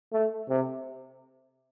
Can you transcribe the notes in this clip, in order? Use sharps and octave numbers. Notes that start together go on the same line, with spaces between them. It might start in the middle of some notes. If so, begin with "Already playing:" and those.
A3
C3